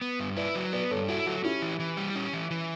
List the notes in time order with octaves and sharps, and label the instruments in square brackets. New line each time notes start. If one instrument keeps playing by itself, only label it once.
[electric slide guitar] B3
G2
[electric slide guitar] E4 [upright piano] B4 D5
[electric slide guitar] F#3
[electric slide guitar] B3 [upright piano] B4 D5
[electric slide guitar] G2 [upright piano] A4 C#5
[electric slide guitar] E4 [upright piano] F#4 A4
[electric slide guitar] F#3 [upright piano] F#4 A4
[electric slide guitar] C#4 [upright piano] E4 G4
[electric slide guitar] E3
E3
G3
C#4
E3
E3